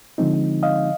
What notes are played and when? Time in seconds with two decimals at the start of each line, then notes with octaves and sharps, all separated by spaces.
0.18 D3 F3 G#3 C4 D#4
0.63 D#5 F5